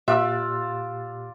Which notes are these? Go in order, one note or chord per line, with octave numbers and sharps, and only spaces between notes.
A#2 F4 G4 D5 E5 B5 E6 F#6